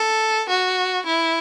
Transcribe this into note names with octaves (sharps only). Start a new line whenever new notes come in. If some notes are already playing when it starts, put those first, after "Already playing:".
Already playing: A4
F#4
E4